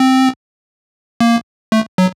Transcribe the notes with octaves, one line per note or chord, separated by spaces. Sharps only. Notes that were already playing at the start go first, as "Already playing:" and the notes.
Already playing: C4
A#3
A3
F#3